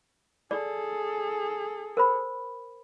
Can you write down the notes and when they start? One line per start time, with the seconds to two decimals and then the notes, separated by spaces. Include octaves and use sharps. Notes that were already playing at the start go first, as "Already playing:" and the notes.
0.51 G#4 A4 D5
1.97 A#4 C5 B5